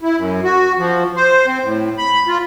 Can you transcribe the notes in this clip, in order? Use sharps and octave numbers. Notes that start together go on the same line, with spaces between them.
E4
F#2
F#4
F3
C5
C4
A2
B5
F4